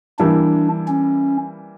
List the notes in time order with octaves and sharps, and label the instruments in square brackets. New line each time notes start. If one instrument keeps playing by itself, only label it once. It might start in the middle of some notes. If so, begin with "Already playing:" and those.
[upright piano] E3 G3 A#3 E4 [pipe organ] D4
[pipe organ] C#4